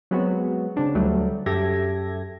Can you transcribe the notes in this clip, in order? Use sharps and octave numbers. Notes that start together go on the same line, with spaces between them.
F#3 G#3 B3 C4 F#4
C#3 C4 D4
D2 F#3 G3 A3
F#2 G4 A4 E5 G#6 A#6